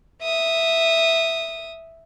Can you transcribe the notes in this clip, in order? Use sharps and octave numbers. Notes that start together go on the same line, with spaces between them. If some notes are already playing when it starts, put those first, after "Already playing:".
E5 D#6